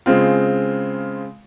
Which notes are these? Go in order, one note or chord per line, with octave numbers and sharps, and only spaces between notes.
C#3 G#3 C4 F4